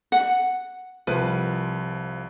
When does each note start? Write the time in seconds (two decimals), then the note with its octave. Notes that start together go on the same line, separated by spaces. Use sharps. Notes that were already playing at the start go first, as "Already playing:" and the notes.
0.12 F#5
1.07 C2 F3 B4